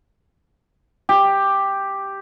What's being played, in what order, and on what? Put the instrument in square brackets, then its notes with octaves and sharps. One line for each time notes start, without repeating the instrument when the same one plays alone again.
[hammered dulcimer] G4